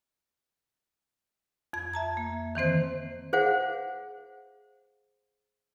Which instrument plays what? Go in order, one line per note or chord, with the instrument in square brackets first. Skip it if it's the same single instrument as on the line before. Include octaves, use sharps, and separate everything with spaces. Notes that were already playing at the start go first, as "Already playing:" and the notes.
[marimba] F2 G#6
E5 A5 A#5
A#3
D#3 E3 C4 C5
[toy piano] G#4 C5 F5 F#5